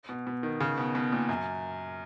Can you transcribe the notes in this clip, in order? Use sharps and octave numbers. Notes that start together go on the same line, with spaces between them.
B2
B2
D#3
C#3
B2
B2
A#2
F#2